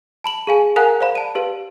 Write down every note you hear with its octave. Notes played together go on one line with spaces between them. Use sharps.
A5 B5 F#7
G#4 F5 G#5
A#4 F5 F#5 G#5 A#5 F#6
C5 D5 F5 B5
A5 D#7
G4 B4 F5